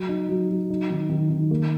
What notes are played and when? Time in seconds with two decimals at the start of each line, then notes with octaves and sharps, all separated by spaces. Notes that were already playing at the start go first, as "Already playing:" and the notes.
Already playing: F#3
0.09 D#4
0.29 F#3
0.49 F#3
0.70 D#4
0.90 D#3
1.09 D#3
1.30 D#3
1.51 A#3